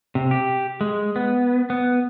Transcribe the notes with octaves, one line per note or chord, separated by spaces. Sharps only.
C3
G4
G#3
B3
B3